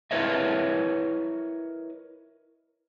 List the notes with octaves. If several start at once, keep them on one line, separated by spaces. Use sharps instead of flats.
E4 A#4 B4 C#5 D#5 E5